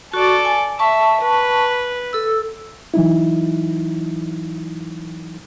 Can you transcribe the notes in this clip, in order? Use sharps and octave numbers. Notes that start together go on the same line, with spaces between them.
F#4 A4 D5 C#6
G#5
E5 A5 C#6
B4
A4 E6
E3 F#3 D#4 E4